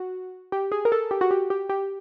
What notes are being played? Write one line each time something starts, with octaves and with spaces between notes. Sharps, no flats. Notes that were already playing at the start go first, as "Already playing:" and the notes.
Already playing: F#4
G4
G#4
A#4
A4
G4
F#4
G4
G4
G4